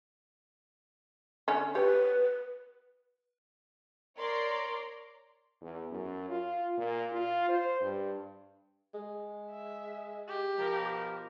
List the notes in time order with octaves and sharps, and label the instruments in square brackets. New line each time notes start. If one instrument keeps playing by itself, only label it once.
[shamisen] D3 C#4
[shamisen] G4 C#5 [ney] B4
[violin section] A#4 C#5 D5 A#5 C6
[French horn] E2
F#2
F4
A#2
F4
C5
G2
[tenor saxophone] G#3
[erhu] E5
G4
[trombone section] B2 F3 A#4